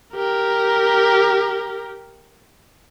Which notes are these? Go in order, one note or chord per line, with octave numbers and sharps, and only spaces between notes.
G4 A#4